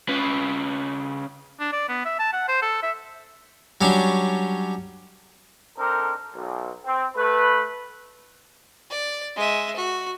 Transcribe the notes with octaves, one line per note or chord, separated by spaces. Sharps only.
C#3 B4
D4
D5
B3
E5
A5
F#5
C5
A4
E5
F#3 G3 C#4 D4
C4 D4 D#4 A4 A#4
B1
C4
A3 B4
D5
G#3 E5
F#4